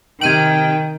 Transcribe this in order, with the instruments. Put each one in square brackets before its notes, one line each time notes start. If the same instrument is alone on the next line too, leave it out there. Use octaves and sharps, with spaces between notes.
[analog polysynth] C3 F6 D7 [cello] D#3 [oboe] G5 [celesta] G#6 D#7 F#7